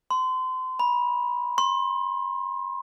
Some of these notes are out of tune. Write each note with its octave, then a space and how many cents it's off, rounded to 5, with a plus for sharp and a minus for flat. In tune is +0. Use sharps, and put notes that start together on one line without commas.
C6 -30
B5 -30
C6 +30